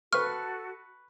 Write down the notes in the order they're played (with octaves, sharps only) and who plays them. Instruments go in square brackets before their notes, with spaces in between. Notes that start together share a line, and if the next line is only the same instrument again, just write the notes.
[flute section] F#4 A4 [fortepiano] B4 C#6 [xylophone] F6